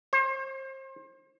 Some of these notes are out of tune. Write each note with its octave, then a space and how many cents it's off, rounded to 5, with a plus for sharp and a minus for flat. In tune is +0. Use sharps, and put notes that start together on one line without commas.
C5 +35